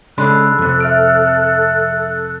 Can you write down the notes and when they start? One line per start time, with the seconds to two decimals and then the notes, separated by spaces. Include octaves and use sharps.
0.18 C#3 G#3 D4 A4 B5 C6 F#6
0.58 F2 C3
0.80 E5 F6 D7